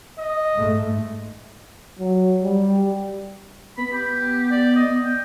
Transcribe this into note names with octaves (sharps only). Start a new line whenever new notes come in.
D#5
G#2 A3
F#3
G3
B3 B5
G4
D5
D#5
G5